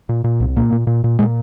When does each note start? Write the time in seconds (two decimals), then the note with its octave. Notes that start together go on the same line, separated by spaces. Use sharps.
0.09 A#2
0.24 A#2
0.40 C2
0.56 A#2 A#3
0.72 A#2
0.87 A#2
1.04 A#2
1.19 A#2 G#3